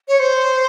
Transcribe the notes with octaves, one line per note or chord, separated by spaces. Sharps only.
C#5
C5